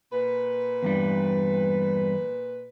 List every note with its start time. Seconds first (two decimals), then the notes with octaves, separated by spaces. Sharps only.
0.13 A#2 B4
0.83 E2 G2 G3